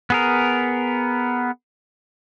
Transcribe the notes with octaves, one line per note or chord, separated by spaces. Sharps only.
B3 G#4 A#4